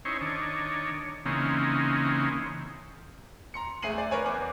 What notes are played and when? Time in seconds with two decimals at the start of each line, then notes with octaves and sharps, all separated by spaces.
0.05 C#4 D#4 E4 C5 C#5
0.21 D#3 D4 C#5
1.26 C#3 E3 A#3 C4 C#4 D#4
3.54 A#5 C6 C#7
3.82 E2 A3 G#4 C7 D#7 F#7
3.98 D5
4.11 A#4 B4 C#5 G#5
4.26 E2 D6